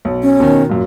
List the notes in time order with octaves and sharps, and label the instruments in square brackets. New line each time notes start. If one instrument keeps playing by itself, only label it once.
[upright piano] B1
[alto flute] C#4
[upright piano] B2 D#3
F#2 A#2